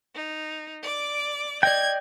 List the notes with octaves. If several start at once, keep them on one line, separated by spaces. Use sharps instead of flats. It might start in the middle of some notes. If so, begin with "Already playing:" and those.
D#4
D5 D6
D5 D#5 G5 G#6